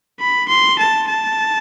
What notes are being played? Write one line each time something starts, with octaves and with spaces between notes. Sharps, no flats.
B5
C6
A5
A5